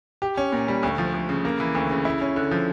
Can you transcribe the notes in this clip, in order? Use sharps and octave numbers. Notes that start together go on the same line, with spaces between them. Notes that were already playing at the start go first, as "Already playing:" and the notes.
G4
C#4
A#2
G3
D2
F3
D2
C#3
A#3
E3
D2
C#3
E4
C#4
D3
F3